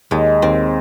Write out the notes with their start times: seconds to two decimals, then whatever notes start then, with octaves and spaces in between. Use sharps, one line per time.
0.11 D#2 G#3
0.42 D#2 C4